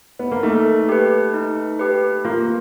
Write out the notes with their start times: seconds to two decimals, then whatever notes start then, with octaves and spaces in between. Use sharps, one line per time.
0.19 B3
0.31 A#3
0.43 A3 D#4
0.89 G4 B4
1.34 D#4
1.80 G4 B4
2.25 A#3 F4